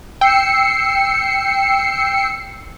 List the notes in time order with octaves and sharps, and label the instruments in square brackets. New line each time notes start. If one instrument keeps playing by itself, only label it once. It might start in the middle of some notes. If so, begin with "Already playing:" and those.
[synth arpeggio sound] G5 [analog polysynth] E6 C7 C#7